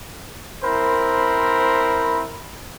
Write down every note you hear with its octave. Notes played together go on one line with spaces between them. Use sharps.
C4 E4 A#4 C5 B5